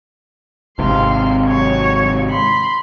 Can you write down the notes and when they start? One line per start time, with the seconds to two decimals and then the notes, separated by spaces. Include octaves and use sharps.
0.79 G#1 G#2 C3 F5 C6
1.48 F#3 C#5
2.29 B5 C6